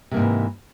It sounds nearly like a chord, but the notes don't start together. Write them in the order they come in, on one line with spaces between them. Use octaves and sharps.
C3 A#3 G#2 F3 E3